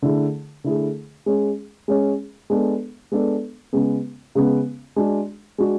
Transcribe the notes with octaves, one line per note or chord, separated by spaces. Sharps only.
D3 A3 E4 G#4
D3 A3 E4 G#4
G#3 C#4 G#4
G#3 C#4 G#4
G#3 B3 D4 A4
G#3 B3 D4 A4
C#3 G#3 B3
C#3 G#3 B3
G#3 D4 F#4
G#3 D4 F#4